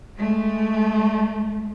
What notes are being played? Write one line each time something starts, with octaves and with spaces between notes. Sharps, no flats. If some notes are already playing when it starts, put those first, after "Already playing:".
G#3 A3